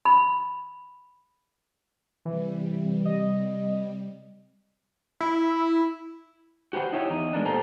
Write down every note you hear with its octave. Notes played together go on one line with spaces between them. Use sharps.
B5
C3 E3 G3
D#5
E4
F#4 G4 B4 C5 F#5
D#4 E4 G4 C#5 E5
E2 D#4
G#3 A#3 B3 D4
A#2 G4 A4 C5 A#5